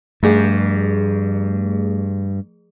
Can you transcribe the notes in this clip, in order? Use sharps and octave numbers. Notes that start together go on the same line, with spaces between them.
G2 F3 A3 G#4